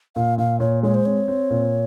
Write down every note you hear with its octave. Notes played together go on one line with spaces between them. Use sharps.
A#2 F5
A#2 F5
A#2 C#5
G#3 C#5
C5
C4 C#5
C4
A#2